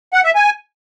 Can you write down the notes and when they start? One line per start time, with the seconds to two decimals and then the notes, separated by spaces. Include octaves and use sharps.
0.13 F#5
0.24 E5
0.35 G#5